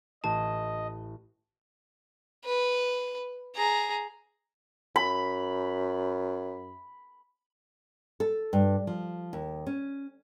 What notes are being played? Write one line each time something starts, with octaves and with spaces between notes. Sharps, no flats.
A1 D#5 A5
B4
G#4 A#5
F#2 B5
A4
G2
F3
D#2
C#4